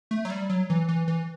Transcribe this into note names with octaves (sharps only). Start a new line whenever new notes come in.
A3
F#3
G3
F#3
E3
E3
E3